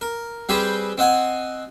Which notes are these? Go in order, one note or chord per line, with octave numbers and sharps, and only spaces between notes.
A#4
G3 C4 G4 G#4 B4 C5
C4 D#5 F#5 G#5